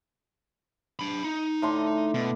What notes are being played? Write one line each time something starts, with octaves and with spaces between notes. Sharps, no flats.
D4 B5
D#4
A2 D3 C6
B2